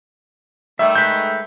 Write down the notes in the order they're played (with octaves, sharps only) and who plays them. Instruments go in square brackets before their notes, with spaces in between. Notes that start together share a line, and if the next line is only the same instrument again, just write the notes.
[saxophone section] D#3 A3 [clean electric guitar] G3 [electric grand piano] E5
[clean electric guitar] G#3 B4 [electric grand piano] G6